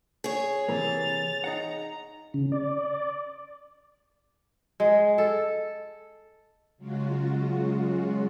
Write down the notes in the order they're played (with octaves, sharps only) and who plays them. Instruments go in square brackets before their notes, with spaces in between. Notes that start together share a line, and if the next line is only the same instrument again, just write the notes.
[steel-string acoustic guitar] G#4 C#5
[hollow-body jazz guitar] C3 E3 A#3 [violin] A6 F7
[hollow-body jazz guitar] D#4 F5 F#5 [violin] A#5
[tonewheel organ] C#3
D5
[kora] G#3
A4
[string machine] C#3 F#3 G#3 F4 F#4